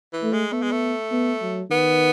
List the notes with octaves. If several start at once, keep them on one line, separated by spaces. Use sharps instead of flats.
E3
A3
G#3
A3 B3
G#3
A3
B3
F#3
D#3 B3